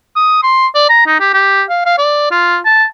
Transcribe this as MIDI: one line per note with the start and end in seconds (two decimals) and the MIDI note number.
0.16 0.43 87
0.43 0.67 84
0.75 0.87 74
0.89 1.04 82
1.06 1.19 63
1.20 1.33 67
1.34 1.63 67
1.69 1.83 77
1.86 1.97 77
1.98 2.30 74
2.31 2.58 65
2.65 2.84 81